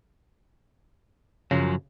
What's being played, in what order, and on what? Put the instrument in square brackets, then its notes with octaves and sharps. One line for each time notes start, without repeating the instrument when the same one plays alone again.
[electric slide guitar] F#2 F3 F#3 [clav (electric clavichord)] C#3